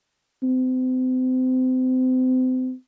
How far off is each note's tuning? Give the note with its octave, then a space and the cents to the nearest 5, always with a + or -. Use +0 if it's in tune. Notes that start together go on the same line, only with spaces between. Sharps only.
C4 -35